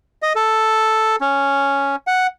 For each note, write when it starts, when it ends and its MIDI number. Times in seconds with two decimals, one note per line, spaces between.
0.22 0.33 75
0.35 1.16 69
1.21 1.96 61
2.07 2.27 78